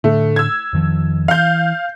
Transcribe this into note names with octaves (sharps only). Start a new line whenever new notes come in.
A2 D3 A3
E6 G#6
F2 D#3 F3
E3 F5 G6